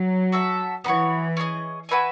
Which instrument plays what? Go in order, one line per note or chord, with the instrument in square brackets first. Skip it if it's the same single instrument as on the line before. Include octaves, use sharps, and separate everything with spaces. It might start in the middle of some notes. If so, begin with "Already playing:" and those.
Already playing: [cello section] F#3
[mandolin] F#4 A4 E5
[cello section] E3 [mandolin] B3 D#4 F#4 C#5
[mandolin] C#4 G#4 D#5
F#4 B4 E5 G#5